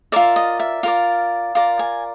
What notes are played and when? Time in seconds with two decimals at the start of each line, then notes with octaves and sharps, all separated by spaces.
0.12 F4 A#4 D5 E5
0.36 D#5
0.59 E5
0.83 F4 A#4 D5 F5
1.55 F4 A#4 D5
1.79 G#5